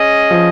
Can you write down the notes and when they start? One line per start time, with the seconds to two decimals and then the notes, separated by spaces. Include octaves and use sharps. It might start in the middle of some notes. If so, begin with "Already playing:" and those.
Already playing: C#4 G#4 D#5
0.31 F3